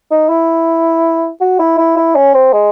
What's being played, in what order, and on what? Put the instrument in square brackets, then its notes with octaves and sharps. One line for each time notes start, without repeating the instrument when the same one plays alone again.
[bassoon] D#4
E4
F#4
E4
E4
E4
C#4
C4
G#3